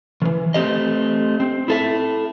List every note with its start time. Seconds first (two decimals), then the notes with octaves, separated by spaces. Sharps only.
0.22 D#3 E3
0.54 A3 C4 G4 D#5
1.40 C4
1.68 E4 A4 E5